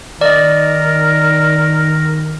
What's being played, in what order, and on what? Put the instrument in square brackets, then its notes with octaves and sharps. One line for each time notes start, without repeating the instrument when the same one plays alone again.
[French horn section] D#3 [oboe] A#4 [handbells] D5 D#5